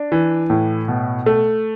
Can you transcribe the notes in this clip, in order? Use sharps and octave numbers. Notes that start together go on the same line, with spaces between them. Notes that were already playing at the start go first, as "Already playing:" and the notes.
Already playing: D4
E3
A2
B2
A3